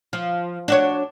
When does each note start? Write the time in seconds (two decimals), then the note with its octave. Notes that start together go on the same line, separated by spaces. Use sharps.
0.13 F3
0.68 D4 F#4 C#5